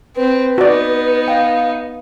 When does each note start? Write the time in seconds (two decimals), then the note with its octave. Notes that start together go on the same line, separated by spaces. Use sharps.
0.16 C4 B4
0.58 B3 D#4 F#4 D5
1.28 F5 G5